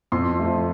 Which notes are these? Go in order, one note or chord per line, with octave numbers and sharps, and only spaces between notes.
F2 C6
F3 A3